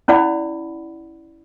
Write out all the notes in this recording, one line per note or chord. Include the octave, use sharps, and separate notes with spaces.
C#4 E4 D5 F#5 B5